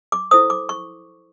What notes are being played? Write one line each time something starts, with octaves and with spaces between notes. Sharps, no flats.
D6
E4 A4 C5 D#6
D6
C#6